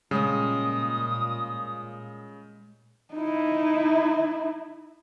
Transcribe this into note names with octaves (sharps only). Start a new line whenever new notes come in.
A#2 C#3 G3 G#3 C#4 D#6
D#4 E4